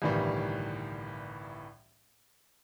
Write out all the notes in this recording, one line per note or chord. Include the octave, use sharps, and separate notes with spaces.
G1 C2 A2 D#3 E3 G3